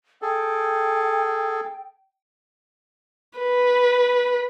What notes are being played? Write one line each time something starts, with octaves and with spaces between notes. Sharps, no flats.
G#4 A4 G5
B4